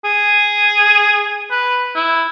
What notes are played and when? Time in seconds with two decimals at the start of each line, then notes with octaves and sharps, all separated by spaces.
0.05 G#4
1.51 B4
1.95 E4